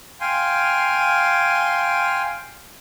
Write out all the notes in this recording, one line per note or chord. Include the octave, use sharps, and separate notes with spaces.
F5 G5 G#5 C6